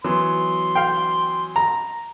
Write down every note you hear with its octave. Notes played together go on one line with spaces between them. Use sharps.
E3 F#3 B3 C6
F5 G5
A#5